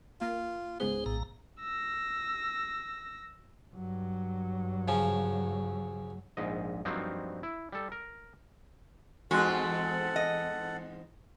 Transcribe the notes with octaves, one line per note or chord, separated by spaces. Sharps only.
A#3 F4
C#2 G#2 B3 G#4 C5
A#1 A2 A#5
E6 A#6
G2 F#3
C#3 F3 C#4
A#1 G#2 D#5
G2 F3 F#3 A#3 C4 D#4
E4
G3 A4
A#4
E2 G#2 G#3 C4 F#4 A4 F#5
D#5